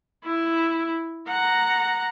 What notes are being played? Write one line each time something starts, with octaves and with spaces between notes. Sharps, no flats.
E4
F#5 A#5